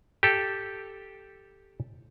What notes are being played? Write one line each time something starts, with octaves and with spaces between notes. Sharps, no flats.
G4 A4